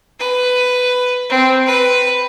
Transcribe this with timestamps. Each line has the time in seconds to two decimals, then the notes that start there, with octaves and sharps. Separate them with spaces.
0.19 B4
1.29 C4
1.66 B4